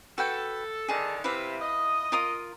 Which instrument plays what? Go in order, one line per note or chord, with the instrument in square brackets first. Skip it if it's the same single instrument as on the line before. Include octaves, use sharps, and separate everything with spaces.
[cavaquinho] F#4 B4 G5 [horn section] A4
[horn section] D3 D#3 [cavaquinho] G#4 A5
[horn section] C3 [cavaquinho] E4 B4 F5
[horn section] D#5
[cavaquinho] F4 A#4 D#6